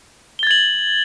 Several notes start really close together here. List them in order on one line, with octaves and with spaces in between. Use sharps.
G7 A6 G#6 F#7